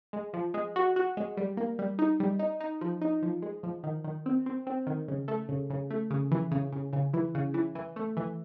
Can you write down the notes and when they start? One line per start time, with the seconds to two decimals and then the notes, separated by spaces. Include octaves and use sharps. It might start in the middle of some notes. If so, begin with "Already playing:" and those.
0.13 G#3
0.33 F3
0.54 G#3
0.76 F#4
0.96 F#4
1.17 G#3
1.37 G3
1.57 A#3
1.79 G3
1.99 D#4
2.20 G3
2.39 D#4
2.60 D#4
2.81 F3
3.01 D#4
3.22 F3
3.42 G#3
3.63 F3
3.83 D#3
4.04 D#3
4.26 C4
4.46 C4
4.67 C4
4.87 D#3
5.08 C#3
5.28 A3
5.49 C#3
5.70 C#3
5.91 A3
6.10 C#3
6.31 E3
6.51 C#3
6.72 C#3
6.93 C#3
7.13 E3
7.35 C#3
7.54 E3
7.75 E3
7.96 A3
8.17 E3